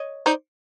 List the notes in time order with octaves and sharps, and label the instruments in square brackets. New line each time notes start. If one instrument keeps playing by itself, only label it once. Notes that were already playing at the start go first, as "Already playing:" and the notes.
Already playing: [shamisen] C#5 D#5
[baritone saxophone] D#4 [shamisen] C5 D5